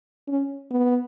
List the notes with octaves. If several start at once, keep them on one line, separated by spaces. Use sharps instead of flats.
C#4
B3